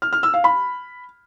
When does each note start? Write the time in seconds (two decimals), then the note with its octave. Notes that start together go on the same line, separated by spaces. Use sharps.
0.02 F6
0.13 F6
0.23 E6
0.34 F5
0.44 B5